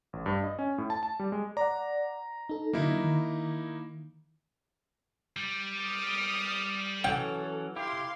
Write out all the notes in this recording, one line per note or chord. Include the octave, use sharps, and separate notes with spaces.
A1
G2
D#5
C#4
A2
A5
A5
G3
G#3
D5 F#5 A#5
D#4 A4
D3 F#3 A#3 D#4 E4
D#3
G3
D#6 F6 D7
E3 F#3 C#4 A4 G5
E4 G4 F5 C6